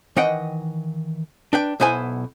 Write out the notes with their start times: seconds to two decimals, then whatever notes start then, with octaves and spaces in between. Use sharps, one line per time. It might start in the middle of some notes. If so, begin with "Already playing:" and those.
0.17 D#3 E3 D#5 F#5 G5
1.53 D4 B4 G5
1.80 B1 B2 B3 E4 C5 G#5